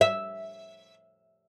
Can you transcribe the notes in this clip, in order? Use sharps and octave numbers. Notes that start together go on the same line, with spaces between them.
E5